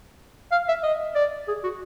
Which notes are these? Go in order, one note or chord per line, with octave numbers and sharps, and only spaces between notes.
F5
E5
D#5
D5
G#4
F#4